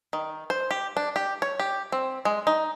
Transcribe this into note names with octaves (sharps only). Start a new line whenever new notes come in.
D#3
C5
G4
D4
G4
C#5
G4
C4
G#3
D#4